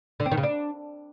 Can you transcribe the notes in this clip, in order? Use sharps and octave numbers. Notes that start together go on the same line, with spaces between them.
D3
C4
D#3
C#3
D4